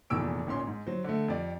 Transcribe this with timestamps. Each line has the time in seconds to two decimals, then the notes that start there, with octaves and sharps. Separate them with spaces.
0.10 F1 E2 A#2 E6 D7
0.47 G#1 A#2 C#4 C6
0.67 G#2
0.87 F#3 C5
1.04 D3 A3
1.28 F2 G4 D5